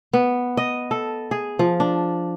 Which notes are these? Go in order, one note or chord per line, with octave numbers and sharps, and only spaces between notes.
B3
D#5
A4
G#4
F3
D4